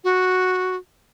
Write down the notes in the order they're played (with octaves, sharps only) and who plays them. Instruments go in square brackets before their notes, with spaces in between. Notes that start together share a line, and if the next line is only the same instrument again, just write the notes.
[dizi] F#4